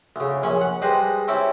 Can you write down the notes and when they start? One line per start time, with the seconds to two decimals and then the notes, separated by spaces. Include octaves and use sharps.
0.16 D2 C#3
0.43 A#1 C#4 G#5 B5
0.61 F#5 B5
0.82 G3 G#3 B4 C5 D#5
1.28 C4 C#4 E4 G4